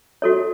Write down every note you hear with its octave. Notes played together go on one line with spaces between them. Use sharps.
F#4 A4 C#5